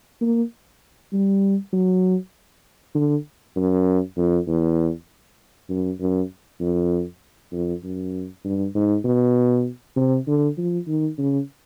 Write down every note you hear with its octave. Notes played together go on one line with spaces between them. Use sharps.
A#3
G3
F#3
D3
F#2
F2
E2
F#2
F#2
F2
F2
F#2
G2
G#2
B2
C3
D3
F3
D#3
C#3